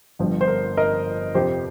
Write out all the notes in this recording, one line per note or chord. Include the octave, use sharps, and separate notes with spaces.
G1 G2 F3
C5
A#4
A#4 D#5
F2 C3 F3 G4 C5